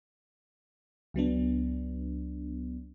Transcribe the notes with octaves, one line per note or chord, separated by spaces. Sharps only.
C#2 F#3 B3 D4